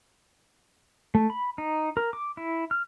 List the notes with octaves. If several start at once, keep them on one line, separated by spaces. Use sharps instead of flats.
A3
B5
D#4
A#4
D6
E4
F6